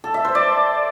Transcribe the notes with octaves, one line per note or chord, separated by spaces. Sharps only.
A4
E5
C5
D5